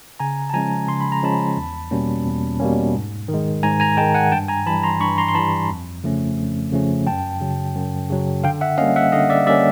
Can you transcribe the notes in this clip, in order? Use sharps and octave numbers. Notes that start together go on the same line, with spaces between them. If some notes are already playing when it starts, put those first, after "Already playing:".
C#3 G#5 A#5
A5
F3 G#3 C#4 G#5 A#5
C#3 C6
B5
A#5
F3 G#3 C#4 A5 B5
E2
B2 G3 A#3 C#4
E2
B2 G3 A#3 C#4
G#2
D#3
G#3
G#2 G#5 A#5
G#5 A#5
D#3 G#3 G5 A5
F#5 G#5
G2 G5 A5
G#5 A#5
E3 G3 A5 B5
A#5 C6
G2 B5 C#6
A#5 C6
C6
E3 G3 A5 B5
F2
C#3 F3 A3 C#4
F2
C#3 F3 A3 C#4
F#2 G5 A5
C#3 F#3
F#2
C#3 F#3
D3 F5 G5
E5 F#5
G3 A#3 C#4 D#5 F5
E5 F#5
D3 D#5 F5
D5 E5
G3 A#3 C#4 D5 E5